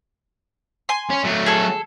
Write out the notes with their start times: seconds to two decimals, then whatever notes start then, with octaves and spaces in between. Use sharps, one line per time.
0.89 G#5 C6
1.10 C#4
1.24 F#3 A3
1.46 G#4 A4